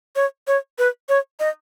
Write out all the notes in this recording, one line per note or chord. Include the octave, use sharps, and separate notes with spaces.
C#5
C#5
B4
C#5
D#5